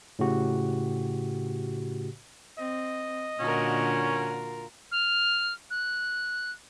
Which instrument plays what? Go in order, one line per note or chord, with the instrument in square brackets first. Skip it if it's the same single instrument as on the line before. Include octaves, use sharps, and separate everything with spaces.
[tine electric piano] A2 C#3 F#4 G4
[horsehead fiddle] C4 [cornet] D#5
[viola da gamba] A#2 D3 F#4 [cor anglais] C#4 [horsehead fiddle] F4 A#4
[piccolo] F6
F#6